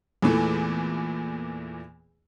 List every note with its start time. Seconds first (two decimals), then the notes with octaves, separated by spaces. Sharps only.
0.22 E2 A#2 E3 A3